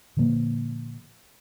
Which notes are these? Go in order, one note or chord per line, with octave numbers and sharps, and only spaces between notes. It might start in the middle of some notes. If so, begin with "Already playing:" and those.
A#2 D3 F3 A#3